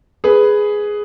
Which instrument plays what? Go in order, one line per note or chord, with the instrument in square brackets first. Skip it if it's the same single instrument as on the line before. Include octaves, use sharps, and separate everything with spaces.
[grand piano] G#4 B4